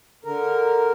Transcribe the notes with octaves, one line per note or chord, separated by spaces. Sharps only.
D3 A#4